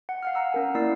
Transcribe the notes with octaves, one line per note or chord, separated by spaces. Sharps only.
F#5
F5 F#5 F6
F#5 A#5 E6
C#4 A#4 G#5
A#3 E4 D5 E6 C7